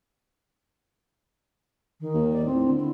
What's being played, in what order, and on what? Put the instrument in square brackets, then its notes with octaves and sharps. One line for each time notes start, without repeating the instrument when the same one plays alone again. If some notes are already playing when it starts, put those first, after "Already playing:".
[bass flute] D#3
[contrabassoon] D#2
[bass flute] D5
[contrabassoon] A2 [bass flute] C4
[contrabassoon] D3
[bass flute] E4